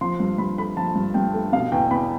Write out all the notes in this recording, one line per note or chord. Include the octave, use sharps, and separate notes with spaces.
F3 C6
G2
G2 B5
A3 B5
F3 A5
G2
G2 G5
A3
B2 F5
E2 G5
E2 B5